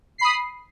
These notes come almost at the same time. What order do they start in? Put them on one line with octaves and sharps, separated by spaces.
C7 B5 D#6